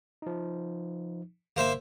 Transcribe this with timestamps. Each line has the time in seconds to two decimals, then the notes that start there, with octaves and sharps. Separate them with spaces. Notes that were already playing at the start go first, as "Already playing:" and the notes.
0.22 F3 D#4
1.56 G1 A#3 C5 E5